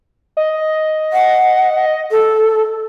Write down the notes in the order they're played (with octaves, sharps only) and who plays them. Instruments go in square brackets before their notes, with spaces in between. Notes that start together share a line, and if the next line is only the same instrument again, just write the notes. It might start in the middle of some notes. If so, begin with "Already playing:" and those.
[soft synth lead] D#5
[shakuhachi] F#5
A4